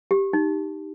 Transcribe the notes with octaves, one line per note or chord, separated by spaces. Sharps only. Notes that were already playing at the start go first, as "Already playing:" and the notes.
G4
D#4